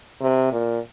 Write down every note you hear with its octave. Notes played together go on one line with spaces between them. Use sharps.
C3
A#2